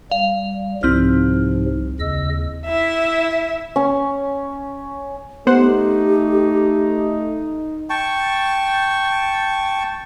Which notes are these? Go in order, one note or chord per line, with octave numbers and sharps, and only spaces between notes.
G3 F5
C2 G#2 C3 F3 C4 E4 F6
D#2 C#3 D#5 E6
E4 E5
C#4
A3 B3 D#4 G4 C5 F#5
G5 A5 C#6